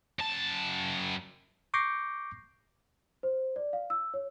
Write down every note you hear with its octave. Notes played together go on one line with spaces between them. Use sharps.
F#2 A5
C#6 D6 G6 A#6 C7
C5
D5
F5
E6
C#5